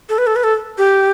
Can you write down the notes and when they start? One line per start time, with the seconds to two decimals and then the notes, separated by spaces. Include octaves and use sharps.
0.09 A4
0.18 B4
0.27 A4
0.36 B4
0.44 A4
0.78 G4